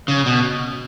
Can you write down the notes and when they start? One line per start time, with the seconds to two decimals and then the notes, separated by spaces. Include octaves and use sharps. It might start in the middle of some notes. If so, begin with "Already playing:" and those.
0.08 C#3
0.26 B2